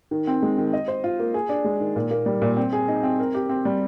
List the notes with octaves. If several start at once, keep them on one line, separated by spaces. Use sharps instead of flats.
D#3
C4
G#3
D#3
D#5
C5
F4
A#3
G#4
D4
G#3
D#3
A#2
A#3
G3
A#2
C4
G#4
D#4
C4
A#4
G4
C4
G3